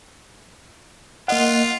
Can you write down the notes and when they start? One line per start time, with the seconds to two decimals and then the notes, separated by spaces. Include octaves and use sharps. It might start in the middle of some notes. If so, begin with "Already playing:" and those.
1.28 A#3 F4 D#5 F#5